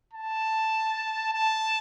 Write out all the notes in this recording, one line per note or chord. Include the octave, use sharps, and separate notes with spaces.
A5
A5